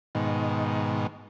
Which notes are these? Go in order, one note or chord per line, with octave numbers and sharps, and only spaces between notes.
G#2 B2 D#3